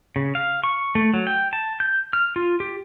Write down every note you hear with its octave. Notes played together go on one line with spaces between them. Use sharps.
C#3
F5
C#6
A3
F#3
G5
A5
G6
F6
F4
G4